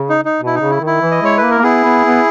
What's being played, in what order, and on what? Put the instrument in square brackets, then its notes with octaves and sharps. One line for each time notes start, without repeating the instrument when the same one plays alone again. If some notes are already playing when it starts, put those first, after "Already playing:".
Already playing: [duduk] C#3
[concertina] D#4
D#4
[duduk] B2
[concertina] E4
D#4
[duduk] C#3
[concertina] E4
[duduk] D#3
[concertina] E4
[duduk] E3
[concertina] D#5
[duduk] G#3 [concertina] C#5
[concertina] B4
[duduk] A#3
[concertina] A#4
[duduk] A#3
[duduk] B3 [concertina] E4 G#4
[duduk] B3
B3